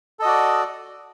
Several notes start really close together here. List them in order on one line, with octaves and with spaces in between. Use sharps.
A4 D#5 F#4 D5